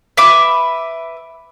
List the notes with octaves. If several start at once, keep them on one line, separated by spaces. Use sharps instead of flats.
B4 E5 D6